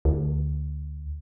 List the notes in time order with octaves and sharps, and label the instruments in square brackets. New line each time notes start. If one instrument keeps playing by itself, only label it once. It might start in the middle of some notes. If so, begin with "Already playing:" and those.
[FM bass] D2